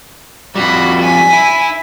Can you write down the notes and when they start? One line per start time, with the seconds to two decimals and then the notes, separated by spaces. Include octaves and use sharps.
0.55 F2 G3 F#4 B5
1.02 G#5 B6
1.33 E4